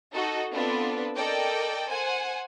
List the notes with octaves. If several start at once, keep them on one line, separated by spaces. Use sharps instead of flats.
D#4 F#4 A4
B3 C4 D4 F4 A4 B4
A4 A#4 D5 D#5 G5
C5 F#5 G#5